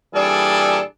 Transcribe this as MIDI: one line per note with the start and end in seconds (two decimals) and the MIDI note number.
0.14 0.81 46
0.14 0.81 52
0.14 0.81 55
0.14 0.81 62
0.14 0.81 68
0.14 0.81 69